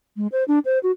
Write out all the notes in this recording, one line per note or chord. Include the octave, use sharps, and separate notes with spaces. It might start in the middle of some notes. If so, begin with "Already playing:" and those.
G#3
C5
D4
C5
F#4